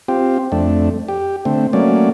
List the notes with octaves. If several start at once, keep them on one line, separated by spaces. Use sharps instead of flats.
C4 F4 G4
F2 A3 D4
G4
D3 A3 C4
F#3 A3 A#3 C#4 D5